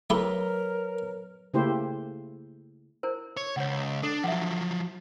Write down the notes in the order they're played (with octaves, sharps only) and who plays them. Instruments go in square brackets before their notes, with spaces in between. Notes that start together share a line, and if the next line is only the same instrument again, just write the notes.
[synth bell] F#3 [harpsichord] A3 E4 G4 [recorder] A#4 [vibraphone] B4 C#5
[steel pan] C#3 A3 A#3 E4 G4 C5
[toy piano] E4 A#4 C5
[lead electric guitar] C#5
[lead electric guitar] C#2 [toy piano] C#5 F#5
[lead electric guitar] D4 [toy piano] A4
[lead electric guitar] F3 F#3 [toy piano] E5 F#5